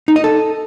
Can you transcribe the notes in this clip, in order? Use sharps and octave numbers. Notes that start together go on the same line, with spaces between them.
D#4
D#5
A4